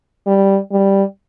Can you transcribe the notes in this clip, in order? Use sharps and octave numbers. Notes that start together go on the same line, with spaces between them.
G3
G3